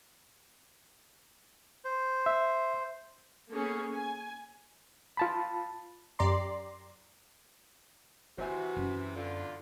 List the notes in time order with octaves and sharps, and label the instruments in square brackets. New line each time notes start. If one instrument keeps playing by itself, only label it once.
[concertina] C5
[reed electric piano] E5
[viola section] A#3 B3 C#4 G#4 A4
G#5
[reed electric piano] F4 A5 B5
[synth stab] F#2 G4 D5 A#5 C6
[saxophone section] C3 E3 [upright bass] F4 [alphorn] F#4 [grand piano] C5 E5 G#5
[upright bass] F#2
[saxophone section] E2 D3 [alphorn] F4